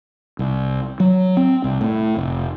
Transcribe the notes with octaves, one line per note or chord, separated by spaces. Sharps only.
C2
F#3
C4
C2
A2
F1